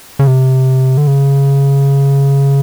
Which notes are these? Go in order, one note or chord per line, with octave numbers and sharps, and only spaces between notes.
C#3
C3
D3
C#3